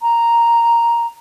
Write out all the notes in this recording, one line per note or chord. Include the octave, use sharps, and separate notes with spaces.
A#5